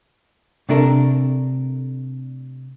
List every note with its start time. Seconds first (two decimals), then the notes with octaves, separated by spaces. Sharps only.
0.69 C3 A3 D4 A4 A#4